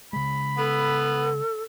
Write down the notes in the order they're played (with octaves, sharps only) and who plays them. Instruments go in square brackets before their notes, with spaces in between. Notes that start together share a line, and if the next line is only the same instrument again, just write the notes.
[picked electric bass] C#3 G#3 [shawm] B5
[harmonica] B3 [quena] A4